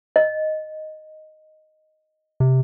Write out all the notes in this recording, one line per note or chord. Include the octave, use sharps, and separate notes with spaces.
D#5
C3